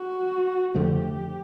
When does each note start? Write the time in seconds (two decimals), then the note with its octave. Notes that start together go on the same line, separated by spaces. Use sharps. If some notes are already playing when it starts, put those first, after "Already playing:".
Already playing: F#4
0.75 F2 D3 F3 A3 G4